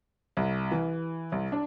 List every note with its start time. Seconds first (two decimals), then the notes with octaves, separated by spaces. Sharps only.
0.37 C2
0.71 E3
1.32 C2
1.52 D4